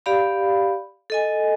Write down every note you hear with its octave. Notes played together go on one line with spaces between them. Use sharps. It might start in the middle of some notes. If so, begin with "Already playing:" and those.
G4 D5 F5 B5
A4 D#5 G#5